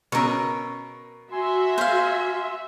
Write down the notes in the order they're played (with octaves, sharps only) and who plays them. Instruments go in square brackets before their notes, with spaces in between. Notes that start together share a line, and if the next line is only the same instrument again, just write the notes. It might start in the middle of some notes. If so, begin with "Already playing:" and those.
[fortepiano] B2 C#4 E6 [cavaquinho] A#4 C#6
[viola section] F#4 E5 [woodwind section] G#5 C6
[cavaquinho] C5 F5